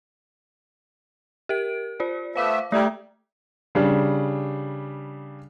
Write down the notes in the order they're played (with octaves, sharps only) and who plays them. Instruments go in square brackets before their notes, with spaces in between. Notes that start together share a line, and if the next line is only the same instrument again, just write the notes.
[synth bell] G4 A#4 D7
F4 C5 D5
[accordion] A3 B3 E5 [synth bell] C5 F5 D6
[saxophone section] G3 [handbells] A3 [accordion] E4 [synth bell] D5 A#5 G#6
[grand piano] C#3 G3 D4